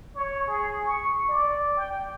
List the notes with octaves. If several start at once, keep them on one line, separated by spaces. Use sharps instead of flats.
C#5
G#4
C#6
D5
G5